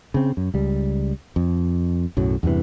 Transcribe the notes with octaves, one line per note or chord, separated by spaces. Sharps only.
C#3 C4
F#2
C#2 G3
F2
B1 F#2 A2 F#3
E2 G2 C3 E3